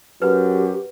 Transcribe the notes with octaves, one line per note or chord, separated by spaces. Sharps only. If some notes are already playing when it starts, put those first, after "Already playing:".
F#2 G4 B4